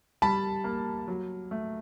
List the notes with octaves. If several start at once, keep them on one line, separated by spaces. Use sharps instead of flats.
G3 A5 B5
A#3
F#3
A3